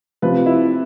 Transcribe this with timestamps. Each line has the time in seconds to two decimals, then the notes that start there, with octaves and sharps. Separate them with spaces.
0.22 C3 F3 B4
0.46 E4